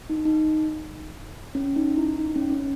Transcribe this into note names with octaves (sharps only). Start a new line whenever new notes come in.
D#4
D#4
C#4
D#4
E4
D#4
C#4
C#4